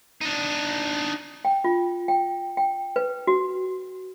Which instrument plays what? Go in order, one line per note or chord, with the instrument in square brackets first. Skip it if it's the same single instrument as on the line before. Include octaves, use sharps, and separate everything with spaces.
[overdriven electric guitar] D4 D#4
[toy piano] G5
F4
G5
G5
B4
F#4